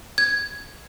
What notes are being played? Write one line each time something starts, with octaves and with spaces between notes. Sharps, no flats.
G#6